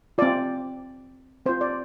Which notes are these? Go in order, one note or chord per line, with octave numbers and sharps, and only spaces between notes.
C4 F4 D5
C4 F4 C5
D5